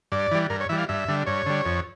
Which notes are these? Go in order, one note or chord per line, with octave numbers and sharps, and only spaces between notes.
G2 D5
E3 G3
G2 A#4
C#5
E3 G3 E5
F5
G2 E5
D3 G3
G2 C#5
D3 G3
F2